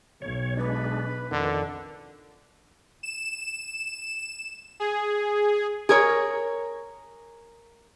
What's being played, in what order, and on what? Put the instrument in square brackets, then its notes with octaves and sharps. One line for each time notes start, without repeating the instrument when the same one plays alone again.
[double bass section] B1 [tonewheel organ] C#5
[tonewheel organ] G#3 D4 [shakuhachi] B4
[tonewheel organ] F2 D#3 [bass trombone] D3
[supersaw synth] E7
G#4
[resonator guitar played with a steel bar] G#4 A#4 C#5